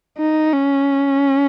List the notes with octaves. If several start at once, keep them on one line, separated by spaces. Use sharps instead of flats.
D#4
C#4